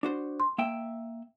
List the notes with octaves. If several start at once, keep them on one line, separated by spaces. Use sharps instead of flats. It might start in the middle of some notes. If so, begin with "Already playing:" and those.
D4 F#4 C5
C6
A#3 E5 G5